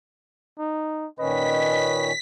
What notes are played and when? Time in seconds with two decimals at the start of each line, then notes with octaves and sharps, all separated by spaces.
0.59 D#4
1.19 A#2 D#3 C#4 B4 D#5 B6